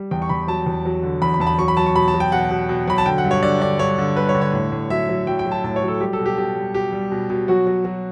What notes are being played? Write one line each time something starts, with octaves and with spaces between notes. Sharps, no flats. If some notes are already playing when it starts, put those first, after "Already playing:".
Already playing: G3
E2 G5
C#6
E2 B5
F#3 A5
E2
F#3
D3
E2 B5
B5
E2 A5
B5
F#3 C#6
B5
F#3 A5
C#6
B2 B5
A5
F#3
G5
B2 F#5
B2
B2
F#3 B5
A5
D3 G5
F#5
G2
C#5
D3 D5
D3 D5
G2 C#5
D3
G3 B4
C#5
D3
C#5
A2
A2
F#3 E5
F#3
F#3 G5
G5
F#3
A5
A2 A5
C#5
F#3
A4
G3 G4
A4
B2
G4
B2 G4
G3
B2 G4
G3
B2
B2
F#3 F#4
F#3
F#3